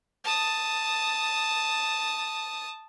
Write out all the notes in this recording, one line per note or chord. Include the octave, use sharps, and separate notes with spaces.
A5 D#6